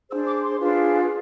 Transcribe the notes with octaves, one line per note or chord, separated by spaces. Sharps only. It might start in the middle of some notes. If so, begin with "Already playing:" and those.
D4 G#4 C5 E6
D6
C6
D4 F4 G#4 B4